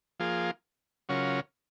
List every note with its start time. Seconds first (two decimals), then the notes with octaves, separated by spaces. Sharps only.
0.20 F3 A#3 F4 G#4
1.09 C#3 F#3 C#4 F4 A#4